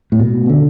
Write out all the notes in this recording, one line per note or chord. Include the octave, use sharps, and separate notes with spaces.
A2
B2
D3